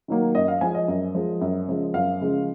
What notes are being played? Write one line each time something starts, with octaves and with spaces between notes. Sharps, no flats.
D#3 F#3 A#3
F#2 D#5
F5
F3 G#3 G#5
D#5
F#2
F3 G#3
F#2
C#3 F3 G#3
F#2 F5
C#3 F3 G#3